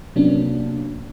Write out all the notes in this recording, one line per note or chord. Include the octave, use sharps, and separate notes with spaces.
C3 F#3 A#3 B3 C#4 D4